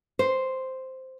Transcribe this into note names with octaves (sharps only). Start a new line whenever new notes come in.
C5